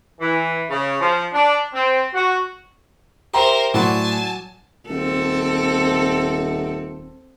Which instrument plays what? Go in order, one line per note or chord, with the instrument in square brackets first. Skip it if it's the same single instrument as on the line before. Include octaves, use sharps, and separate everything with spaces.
[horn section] E3
C#3
F3
D4
C4
F#4
[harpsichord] G4 [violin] A#4 C5 [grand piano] E5 A#5 C6
[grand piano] A2 D5 C6 [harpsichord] F#3 F#5 D6 [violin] G#5 A5
[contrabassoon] D#1 [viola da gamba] C4 A4